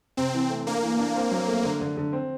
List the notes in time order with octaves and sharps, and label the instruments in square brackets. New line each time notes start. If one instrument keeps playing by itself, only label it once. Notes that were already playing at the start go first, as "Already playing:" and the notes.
[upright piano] C3 [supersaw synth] C4
[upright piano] E3
A3
[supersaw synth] A#3 [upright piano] D4
[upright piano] E3
D4
C4
F#3
A3
D3
D3
D3
C4